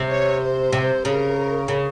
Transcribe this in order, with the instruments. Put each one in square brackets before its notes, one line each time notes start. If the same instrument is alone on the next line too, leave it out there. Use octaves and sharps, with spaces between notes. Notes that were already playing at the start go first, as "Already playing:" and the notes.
Already playing: [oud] C3
[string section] C#5
C5
[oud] C3
[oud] C#3 [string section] A#4
[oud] C#3